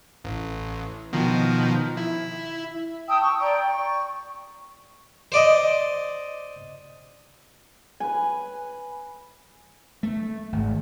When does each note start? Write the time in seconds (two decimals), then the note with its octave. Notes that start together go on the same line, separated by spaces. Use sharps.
0.24 A1
1.13 B2 D#3 F3
1.97 E4
3.08 G5 A5 D#6 E6
3.21 C#6
3.40 D5 G5 A#5
3.65 C#6
5.32 C5 D5 D#5
8.00 B4 G#5
10.03 A3
10.52 G#1